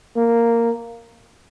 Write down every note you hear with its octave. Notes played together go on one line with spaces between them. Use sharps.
A#3